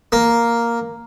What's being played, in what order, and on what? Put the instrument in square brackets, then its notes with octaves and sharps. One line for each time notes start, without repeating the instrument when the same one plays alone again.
[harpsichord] A#3